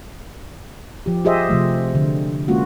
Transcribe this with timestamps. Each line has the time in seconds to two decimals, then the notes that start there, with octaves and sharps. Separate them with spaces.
1.06 F3 G4
1.25 F4 G4 G#4 C5 D#5 E5
1.49 C3 F3 A3
1.95 D3
2.48 G#3 A#3 C#4 F4 F#4